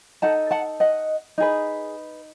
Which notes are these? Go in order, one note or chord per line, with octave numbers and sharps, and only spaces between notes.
D#4 A4 F#5 A5
F#5 A5
D#5 F#5
D#4 G#4 B4